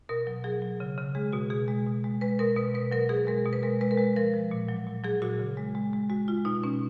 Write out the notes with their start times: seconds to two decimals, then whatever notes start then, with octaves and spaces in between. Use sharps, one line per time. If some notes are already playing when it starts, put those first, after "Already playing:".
0.09 B2 A#4
0.27 F#3
0.44 F#3 G#4
0.62 F#3
0.80 C#3
0.98 C#3
1.15 G#3 G#4
1.33 B2 F#4
1.50 B2 G#4
1.68 G#3
1.87 B2
2.04 G#3
2.21 G#3 B4
2.39 B2 A#4
2.56 B2 B4
2.74 B2 B4
2.91 F#3 A#4
3.09 B2 G#4
3.27 G#3 A#4
3.46 B2
3.53 B4
3.63 G#3 A#4
3.81 G#3 B4
3.91 A#4
3.98 G#3 B4
4.16 F3 A#4
4.34 F3
4.51 A#2
4.69 F#3
4.86 A#2
5.04 F#3 G#4
5.22 A#2 F#4
5.39 C#3
5.57 G#3
5.75 G#3
5.93 G#3
6.10 G#3 F#4
6.28 G#3 F4
6.45 B2 D#4
6.63 B2 C#4